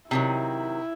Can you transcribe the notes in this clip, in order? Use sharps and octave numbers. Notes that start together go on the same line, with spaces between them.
C3 D#3 F#3 E4